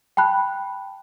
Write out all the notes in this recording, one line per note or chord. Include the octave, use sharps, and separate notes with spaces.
G5 A5 B5 F#6